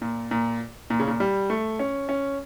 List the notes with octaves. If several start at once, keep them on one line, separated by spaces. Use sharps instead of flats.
A#2
A#2
A#2
C#3
A#2
G3
A3
C#4
C#4